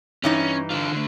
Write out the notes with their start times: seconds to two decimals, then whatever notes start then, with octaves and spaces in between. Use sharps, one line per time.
0.24 G2 E3 C#4 D#4
0.70 D3 F4
0.92 D3 A3